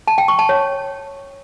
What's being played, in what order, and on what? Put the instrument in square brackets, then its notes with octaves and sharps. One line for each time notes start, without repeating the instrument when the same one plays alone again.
[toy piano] A5
G5
C#6
A5
C#5